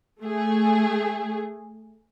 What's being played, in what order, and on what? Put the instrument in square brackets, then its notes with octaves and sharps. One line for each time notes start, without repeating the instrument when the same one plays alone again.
[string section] A3 G#4